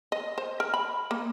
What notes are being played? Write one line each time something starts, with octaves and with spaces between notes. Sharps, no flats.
D#5
C5
A#4
B5
A#3